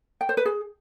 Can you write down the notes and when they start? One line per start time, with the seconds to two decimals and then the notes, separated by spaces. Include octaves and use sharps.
0.21 G5
0.29 C5
0.37 B4
0.45 G#4